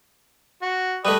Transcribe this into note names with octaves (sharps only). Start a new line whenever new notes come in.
F#4
G3 A3 B4 D#5